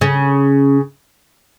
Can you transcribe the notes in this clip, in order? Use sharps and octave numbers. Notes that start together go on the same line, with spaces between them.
C#3 C#4